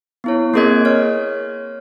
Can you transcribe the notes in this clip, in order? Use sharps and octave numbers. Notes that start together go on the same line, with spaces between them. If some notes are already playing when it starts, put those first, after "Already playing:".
B3 E4 C#5
A#3 C4 G#4 A#4 D#5 G#6
C#5 F6